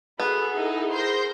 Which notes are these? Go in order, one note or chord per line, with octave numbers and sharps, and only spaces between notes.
B3 F#4 G#4 A4 B5
D#4 E4
G#4 A#4 C5 C6 G6 A#6